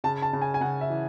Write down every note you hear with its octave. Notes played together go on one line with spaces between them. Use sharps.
C#3 A5
A5
C#3
G#5
G#5
C#3 F#5
E5
E3